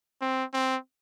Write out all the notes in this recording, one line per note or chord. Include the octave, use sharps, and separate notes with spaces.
C4
C4